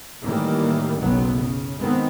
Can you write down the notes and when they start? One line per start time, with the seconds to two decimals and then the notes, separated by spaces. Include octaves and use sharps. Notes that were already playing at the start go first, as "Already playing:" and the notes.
0.23 A2 D#3 E3 G3 A#3
0.98 F#1 B1 F#3 B3
1.34 C#3
1.79 D#3 G#3 B3 C4